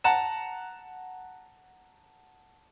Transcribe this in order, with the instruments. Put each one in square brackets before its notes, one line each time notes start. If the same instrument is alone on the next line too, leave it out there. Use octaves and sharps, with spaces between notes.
[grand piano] F#5 A5 A#5 E7